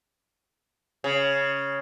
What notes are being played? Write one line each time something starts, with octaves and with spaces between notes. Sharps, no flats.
C#3